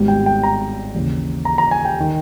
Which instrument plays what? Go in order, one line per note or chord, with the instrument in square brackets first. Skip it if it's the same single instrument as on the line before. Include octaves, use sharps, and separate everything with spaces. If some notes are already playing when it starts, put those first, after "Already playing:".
Already playing: [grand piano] G#1 G#2 G3 B3
G5
G5
A#5
D#2 C#3 E3
A#5
A#5
G#5
G5
D#3